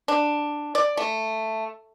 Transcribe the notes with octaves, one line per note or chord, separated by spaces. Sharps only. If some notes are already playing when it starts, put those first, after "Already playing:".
D4
D5
A3